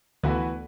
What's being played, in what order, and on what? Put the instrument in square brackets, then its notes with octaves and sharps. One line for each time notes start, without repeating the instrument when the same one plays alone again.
[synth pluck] D2 D3 [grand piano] E3 B3 F#4 B4